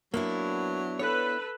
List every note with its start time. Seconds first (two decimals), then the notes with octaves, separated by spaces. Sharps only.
0.14 F#3 A#3 B3 D4 E4
0.99 A4 B4 C#5